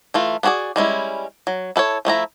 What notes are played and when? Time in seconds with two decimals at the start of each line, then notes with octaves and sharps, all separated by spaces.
0.14 E3 A3 F4
0.43 B3 D4 F#4 G#4 D5
0.76 G3 G#3 C#4 E4
1.47 F#3
1.76 E4 A4 B4 C#5
2.05 F3 A3 E4 A#5